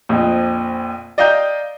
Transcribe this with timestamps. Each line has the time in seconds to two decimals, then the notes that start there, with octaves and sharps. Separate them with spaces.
0.09 A#1 F2
1.18 D5 D#5 F5 G5 A#5 G6